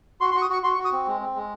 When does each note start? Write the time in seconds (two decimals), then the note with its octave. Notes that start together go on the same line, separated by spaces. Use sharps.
0.21 F#4 C6
0.31 C6
0.34 F#4 C#6
0.42 D#6
0.50 F#4 C#6
0.63 F#4 C6
0.75 C#6
0.79 F#4
0.85 D#6
0.92 C4
1.07 G#3
1.21 C4
1.36 G#3